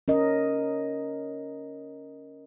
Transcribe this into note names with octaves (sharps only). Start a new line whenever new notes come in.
C#4 A#4 D#5